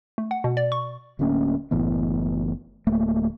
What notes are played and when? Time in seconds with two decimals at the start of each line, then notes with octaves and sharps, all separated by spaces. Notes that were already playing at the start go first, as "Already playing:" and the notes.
0.18 A3
0.31 F#5
0.44 B2
0.57 D5
0.72 C#6
1.19 D1 D2 A#3 C#4
1.71 F#1 A2 E3 B3
2.87 D1 A3 A#3